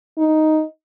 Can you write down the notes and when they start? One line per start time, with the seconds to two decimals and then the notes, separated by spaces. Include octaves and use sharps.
0.18 D#4